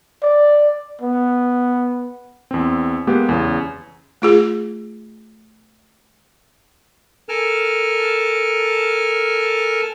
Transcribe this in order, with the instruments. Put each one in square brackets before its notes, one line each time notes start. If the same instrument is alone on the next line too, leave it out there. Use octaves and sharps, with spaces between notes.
[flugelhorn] D5
B3
[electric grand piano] E2 C4
G#3 A#3 B3 G4
E2 C#3
[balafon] A3 F4 G#4
[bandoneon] A4 A#4 G#5 A5 F6